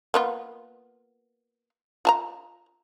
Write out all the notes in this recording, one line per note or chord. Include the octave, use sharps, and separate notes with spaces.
A#3 B3 F4
F4 A5 A#5